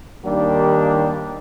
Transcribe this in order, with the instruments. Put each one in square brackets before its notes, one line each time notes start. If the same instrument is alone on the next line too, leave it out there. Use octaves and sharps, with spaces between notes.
[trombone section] D#2 D#3 G3 A#3 D4